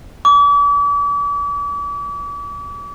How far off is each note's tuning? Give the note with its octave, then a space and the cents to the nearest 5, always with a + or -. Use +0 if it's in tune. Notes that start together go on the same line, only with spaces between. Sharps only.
D6 -40